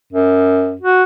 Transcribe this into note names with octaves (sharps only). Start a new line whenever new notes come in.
F#2
F#4